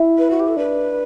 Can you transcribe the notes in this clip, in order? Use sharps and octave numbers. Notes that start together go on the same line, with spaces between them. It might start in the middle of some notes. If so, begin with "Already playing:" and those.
Already playing: E4
B4
F#4
G4
A4
D4 B4